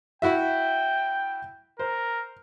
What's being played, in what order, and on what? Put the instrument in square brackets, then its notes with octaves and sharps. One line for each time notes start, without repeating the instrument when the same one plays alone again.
[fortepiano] E4 F#4 E5 [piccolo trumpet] G5
[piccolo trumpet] A#4 [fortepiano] C5